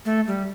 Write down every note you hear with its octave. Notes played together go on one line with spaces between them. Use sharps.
A3
G3